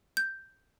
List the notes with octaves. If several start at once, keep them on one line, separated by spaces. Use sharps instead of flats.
G6